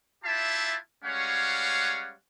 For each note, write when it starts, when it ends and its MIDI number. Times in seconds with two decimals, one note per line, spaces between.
0.24 0.75 64
0.24 0.75 65
0.24 0.75 67
0.24 0.75 76
0.24 0.75 81
1.04 2.13 55
1.04 2.13 56
1.04 2.13 61
1.04 2.13 73
1.04 2.13 77
1.04 2.13 78